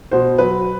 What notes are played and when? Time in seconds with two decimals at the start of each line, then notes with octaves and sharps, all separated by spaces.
0.11 B2 C5
0.38 F#3 B4